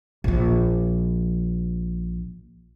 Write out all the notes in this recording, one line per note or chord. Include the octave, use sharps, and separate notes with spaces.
A#1 F3